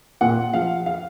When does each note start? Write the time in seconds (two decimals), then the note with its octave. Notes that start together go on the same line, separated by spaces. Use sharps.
0.21 A#2 F#5
0.53 F3 F5
0.86 F5